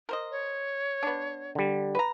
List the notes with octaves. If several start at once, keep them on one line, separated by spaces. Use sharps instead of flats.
A#4 C5 D#5
C#5
B3 D4
D3 G3
B4 A#5